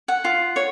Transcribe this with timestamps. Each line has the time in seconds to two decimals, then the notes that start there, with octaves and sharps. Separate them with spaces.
0.08 F#5
0.24 F4
0.56 C#5